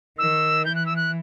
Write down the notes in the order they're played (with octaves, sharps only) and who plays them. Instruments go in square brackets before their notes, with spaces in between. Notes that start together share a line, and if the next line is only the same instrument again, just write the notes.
[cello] D#3 [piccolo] E6
[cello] E3 [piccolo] G6
[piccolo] F#6
E6
F#6